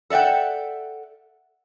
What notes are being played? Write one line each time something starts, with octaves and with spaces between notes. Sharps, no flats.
A4 D5 E5 F#5 G5